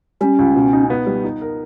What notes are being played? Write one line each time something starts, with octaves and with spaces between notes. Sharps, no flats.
G3 C#4
C#2
B2
D#4
B3
G3
D#4
A#4